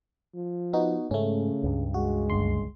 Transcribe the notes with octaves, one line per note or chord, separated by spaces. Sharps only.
F3
B3 D#4 F#4
G#2 C#3 A3 C#4
C#2 G2
G#3 F#4
G1 D2 C6